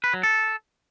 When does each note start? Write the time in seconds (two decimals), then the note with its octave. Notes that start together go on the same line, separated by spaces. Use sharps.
0.04 B4
0.14 F#3
0.23 A4